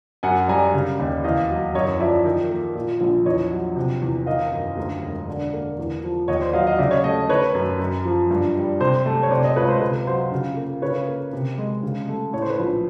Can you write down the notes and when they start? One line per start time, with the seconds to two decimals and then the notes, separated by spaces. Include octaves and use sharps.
0.23 F#2 F#5 G#5
0.48 G3 G#5 A#5
0.74 C#3
0.99 D#2
1.24 E2 D#5 F5
1.50 F#3
1.75 F#2 C#5 D#5
2.00 F3 D5 E5
2.25 D#3
2.50 A#3
2.75 A#2
3.01 A#1
3.25 E2 C#5 D#5
3.51 F#3
3.76 C3
4.02 E2
4.26 D#3 D#5 F5
4.52 F#2
4.77 D2
5.02 E1
5.28 D3
5.53 A#3
5.79 E2
6.04 F3
6.28 D#2 C#5 D#5
6.41 C5 D5
6.53 F#3 D#5 F5
6.67 D#5 F5
6.78 C#3 D5 E5
6.91 C#5 D#5
7.04 A3 C#5 D#5
7.29 D#3 B4 C#5
7.55 F#2
7.79 F#2
8.05 F3
8.31 G2
8.55 G3
8.80 C3 C5
9.06 A3
9.23 C#5
9.31 C3 C5 D5
9.44 C#5 D#5
9.56 C#2 B4 C#5
9.69 C5
9.81 C3 B4
10.07 F#3 C5
10.32 C#3
10.57 A#3
10.82 C#3 B4 C#5
11.07 A#3
11.33 C3
11.58 G#3
11.83 C#3
12.08 A3
12.33 A2 C#5
12.42 C5
12.50 B4 C#5
12.59 A#1